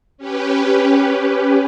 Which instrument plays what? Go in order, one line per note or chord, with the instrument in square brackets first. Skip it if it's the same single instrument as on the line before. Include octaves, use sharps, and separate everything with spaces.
[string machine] C#4 G4 B4